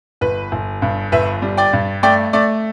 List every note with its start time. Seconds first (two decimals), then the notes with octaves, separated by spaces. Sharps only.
0.21 G1 B4
0.52 G1
0.82 G2
1.12 G1 B4 E5
1.42 G3
1.58 D5 G5
1.73 G2
2.03 A3 D5 G5
2.33 A3 D5